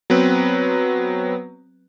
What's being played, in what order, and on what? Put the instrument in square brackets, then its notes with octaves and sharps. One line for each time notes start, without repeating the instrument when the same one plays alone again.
[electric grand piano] F#3 B3 C4 B4